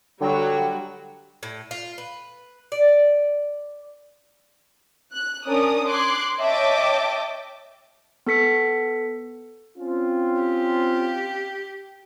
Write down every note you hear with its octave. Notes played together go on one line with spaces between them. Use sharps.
D3 F#3 G3 F#4 G5
A2
F4
B4
D5
F#6
C#4 D4 A#4 D5 D#6
C6 D6 F#6 G#6
C#5 D#5 E5 G5 A5 D6
B3 A4 B6 C#7
C4 C#4 F4
G4